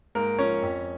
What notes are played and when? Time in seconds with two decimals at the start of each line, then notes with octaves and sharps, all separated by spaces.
0.15 G#2 A#3 A#4
0.38 F3 C#4 C#5
0.62 F2